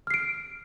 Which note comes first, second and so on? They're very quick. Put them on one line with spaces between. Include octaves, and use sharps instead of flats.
F6 C7 D7